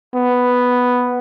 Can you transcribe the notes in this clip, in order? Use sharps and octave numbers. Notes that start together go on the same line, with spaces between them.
B3